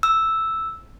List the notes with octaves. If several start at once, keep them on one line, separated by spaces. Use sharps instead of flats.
E6